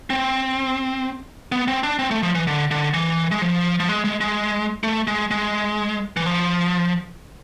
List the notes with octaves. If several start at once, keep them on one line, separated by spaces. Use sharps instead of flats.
C4
B3
C4
D4
C4
A3
F3
E3
D3
D3
E3
G#3
F3
F3
G#3
G#3
G#3
A3
G#3
G#3
E3
F3